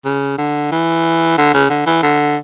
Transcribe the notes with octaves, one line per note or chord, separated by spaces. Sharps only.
C#3
D3
E3
D3
C#3
D3
E3
D3